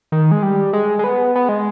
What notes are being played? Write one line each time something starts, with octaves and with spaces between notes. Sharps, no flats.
D#3
G#3
G3
G#3
G#3
B3
B3
G#3